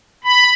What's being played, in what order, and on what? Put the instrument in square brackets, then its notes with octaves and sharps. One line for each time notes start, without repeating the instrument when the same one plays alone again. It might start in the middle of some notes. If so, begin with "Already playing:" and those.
[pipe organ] B5